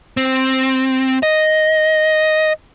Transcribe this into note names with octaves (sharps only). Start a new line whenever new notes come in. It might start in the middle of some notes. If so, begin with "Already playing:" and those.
C4
D#5